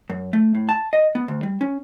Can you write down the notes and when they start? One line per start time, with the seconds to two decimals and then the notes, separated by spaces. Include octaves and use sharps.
0.10 F#2
0.33 A3
0.55 A2
0.69 A5
0.93 D#5
1.15 B3
1.28 D2
1.43 G3
1.61 C#4